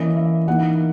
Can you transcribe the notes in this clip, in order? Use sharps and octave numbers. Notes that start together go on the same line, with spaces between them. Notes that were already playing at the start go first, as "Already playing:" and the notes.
Already playing: E3 A#3 C#4 D#5
E5
E3 A#3 D#4 F#5